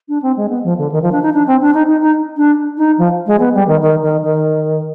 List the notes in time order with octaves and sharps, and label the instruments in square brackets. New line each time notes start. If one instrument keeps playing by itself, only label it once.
[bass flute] D4
C4
G#3
B3
F3
D3
D#3
F3
D4
D#4
D4
C4
D4
D#4
D#4
D#4
D4
D#4
F3
G#3
B3
G3
D#3
D#3
D#3
D#3